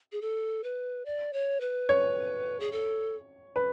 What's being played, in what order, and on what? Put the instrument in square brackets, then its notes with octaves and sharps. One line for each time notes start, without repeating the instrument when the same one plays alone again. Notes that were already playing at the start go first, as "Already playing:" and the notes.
[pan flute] G#4
A4
B4
D5
C#5
B4
[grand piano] C#5
[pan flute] G#4
A4
[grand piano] B4